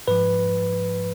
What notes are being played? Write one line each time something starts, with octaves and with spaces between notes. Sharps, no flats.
G#2 F3 B4